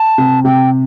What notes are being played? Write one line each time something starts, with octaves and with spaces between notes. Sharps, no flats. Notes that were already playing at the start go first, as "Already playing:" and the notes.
Already playing: A5
C3
C3 G5